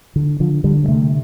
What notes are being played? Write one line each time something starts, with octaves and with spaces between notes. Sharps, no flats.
D3
D3 F3
D3 G3
G3
C3 A3